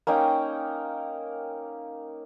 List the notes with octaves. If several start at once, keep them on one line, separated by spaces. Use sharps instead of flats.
A#3 C#4 D#4 G5